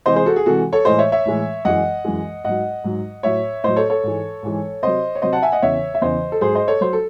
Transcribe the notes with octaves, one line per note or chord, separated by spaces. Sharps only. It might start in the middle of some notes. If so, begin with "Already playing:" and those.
C3 E3 G#3 C5 D#5
G#4 C5
F#4 A4
G#4
C3 E3 G#3 F#4 A4
A4 C#5
A2 E3 G#3 C5 D#5
C#5 E5
C#5 E5
A2 E3 G#3
F#2 E3 G#3 D#5 F#5
F#2 E3 G#3
G#2 F#3 D#5 F#5
G#2 F#3
A2 F#3 C#5 E5
A2 F#3 C5 D#5
A4 C#5
A4 C#5
G#2 E3 G#3
G#2 E3 G#3
C3 F#3 C5 D#5
C#5
C3 F#3 C5 D#5
F#5 A5
E5 G#5
D#5 F#5
E2 C#3 E3 C#5 E5
E5
E2 C#3 E3 C5 D#5
A4
G#2 F#3 G#4 C5
C5 D#5
A4 C#5
F#3 C5
A4